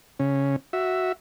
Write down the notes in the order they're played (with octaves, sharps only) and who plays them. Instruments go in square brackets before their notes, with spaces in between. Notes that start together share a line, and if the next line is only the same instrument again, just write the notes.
[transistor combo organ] C#3 C#4
F#4 E5